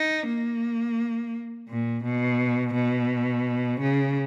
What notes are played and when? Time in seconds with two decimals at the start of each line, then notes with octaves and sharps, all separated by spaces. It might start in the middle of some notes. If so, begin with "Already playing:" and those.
Already playing: D#4
0.27 A#3
1.69 A#2
2.04 B2
2.74 B2
3.80 C#3